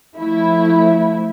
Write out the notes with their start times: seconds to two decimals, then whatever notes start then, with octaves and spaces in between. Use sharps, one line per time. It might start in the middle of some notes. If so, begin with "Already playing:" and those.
0.17 F3 A3 E4